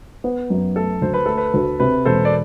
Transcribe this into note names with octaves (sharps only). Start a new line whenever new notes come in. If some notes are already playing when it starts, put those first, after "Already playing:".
B3
F#2
A3 A4
D2 C5
B4
A3 A4
B4
D2
C3 B4
E1 A4 C5
D5